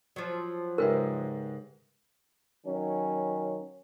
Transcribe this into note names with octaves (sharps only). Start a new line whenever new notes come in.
F3 F#3
G#2 C#3 G#3 G4 A#4 B4 E5
D#3 F#3 C#4